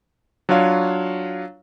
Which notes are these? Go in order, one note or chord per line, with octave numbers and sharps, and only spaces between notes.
F#3 D4 F4 C#5 F5